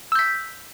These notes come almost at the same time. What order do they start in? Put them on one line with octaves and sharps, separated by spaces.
E6 G6 B6